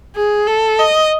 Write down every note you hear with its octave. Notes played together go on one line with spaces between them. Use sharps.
G#4
A4
D#5